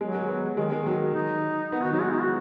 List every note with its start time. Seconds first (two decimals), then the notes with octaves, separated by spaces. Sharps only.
0.01 F#3 G#3
0.15 G#3
0.29 B3
0.57 D#3 G#3
0.72 D#3 G#3
0.86 F#3
1.14 D#4
1.72 B3 D#4
1.82 D#3 F#4
1.92 F#3 D#4
2.00 G#3 F#4
2.12 D#4
2.21 F#4